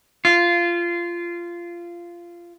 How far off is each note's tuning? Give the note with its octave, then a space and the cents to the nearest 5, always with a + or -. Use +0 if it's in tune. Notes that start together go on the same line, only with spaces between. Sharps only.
F4 -15